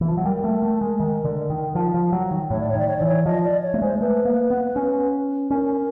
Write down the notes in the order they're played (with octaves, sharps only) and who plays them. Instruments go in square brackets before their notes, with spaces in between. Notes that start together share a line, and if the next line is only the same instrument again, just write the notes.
[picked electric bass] E3
F3
F#3
[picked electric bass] G3 [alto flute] A#4
[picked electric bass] A3
A3
G#3
D#3
D3
D#3
F3
F3
F#3
D#3
[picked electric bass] A2 [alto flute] C#5
[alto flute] D5
C#5
[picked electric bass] D#3 [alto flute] D5
[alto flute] C#5
[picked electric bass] E3 [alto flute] D5
[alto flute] C#5
[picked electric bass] F3 [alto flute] D#5
[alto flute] D5
C#5
[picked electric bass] A3
[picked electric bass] G#3 [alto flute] C5
[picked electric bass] A3 [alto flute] B4
[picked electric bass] A#3
B3
C#4
[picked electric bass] C#4 [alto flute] A#4